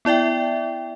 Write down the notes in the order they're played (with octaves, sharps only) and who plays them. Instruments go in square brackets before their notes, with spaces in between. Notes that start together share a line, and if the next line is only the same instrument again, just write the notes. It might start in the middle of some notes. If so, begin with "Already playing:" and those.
[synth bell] B3 E4 D5 E5 G5